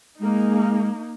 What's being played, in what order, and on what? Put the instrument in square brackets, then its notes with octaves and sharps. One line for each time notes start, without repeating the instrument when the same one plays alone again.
[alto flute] G#3 [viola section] A#3 D#4